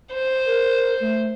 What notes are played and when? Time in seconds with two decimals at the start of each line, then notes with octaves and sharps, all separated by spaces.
0.13 C5
0.46 A#4
1.00 A3